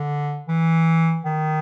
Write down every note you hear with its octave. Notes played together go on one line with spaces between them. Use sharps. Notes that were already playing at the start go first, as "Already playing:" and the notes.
Already playing: D3
E3
D#3